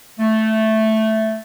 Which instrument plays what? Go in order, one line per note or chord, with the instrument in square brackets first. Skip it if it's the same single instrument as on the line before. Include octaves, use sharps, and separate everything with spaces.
[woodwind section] A3